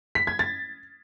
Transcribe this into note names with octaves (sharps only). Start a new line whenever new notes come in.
B6
G#6
A6